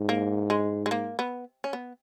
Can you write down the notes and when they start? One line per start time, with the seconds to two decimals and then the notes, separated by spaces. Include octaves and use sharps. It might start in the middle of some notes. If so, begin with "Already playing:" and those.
Already playing: G#2
0.09 A#3
0.50 G#3
0.86 G#3
0.91 A#3
1.19 B3
1.64 C#4
1.73 B3